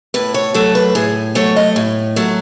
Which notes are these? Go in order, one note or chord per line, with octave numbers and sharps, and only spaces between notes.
A2 B4
C#5
F#3 A3 A4
B4
A2 G#4
F#3 A3 C#5
D#5
A2
F#3 A3